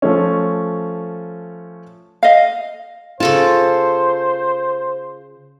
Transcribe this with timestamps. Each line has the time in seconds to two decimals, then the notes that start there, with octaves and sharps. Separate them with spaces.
0.02 F3 A3 C#4
2.23 D#5 F5
3.20 C#3 F4 A4 C5 A5